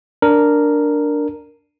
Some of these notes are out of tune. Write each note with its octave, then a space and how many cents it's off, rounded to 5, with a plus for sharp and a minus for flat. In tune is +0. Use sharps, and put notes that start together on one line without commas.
D4 +0 A#4 -5